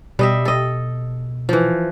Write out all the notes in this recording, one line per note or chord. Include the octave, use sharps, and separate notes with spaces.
B2 G3 D#5 E5
A4 D#5
E3 F3